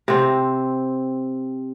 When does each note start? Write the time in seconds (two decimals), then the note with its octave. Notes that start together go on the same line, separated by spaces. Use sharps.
0.08 C3 C4